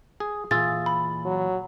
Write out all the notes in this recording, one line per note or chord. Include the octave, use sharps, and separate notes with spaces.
G#4
A#2 E3 F4 G#4 E6 A6
B5
F#3